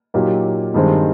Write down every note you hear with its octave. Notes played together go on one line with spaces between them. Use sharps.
A#2 F#3 A#3 D#4 G4
G2 D#3 G#3 C4